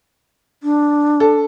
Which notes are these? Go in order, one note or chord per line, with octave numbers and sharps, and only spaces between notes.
D4
A4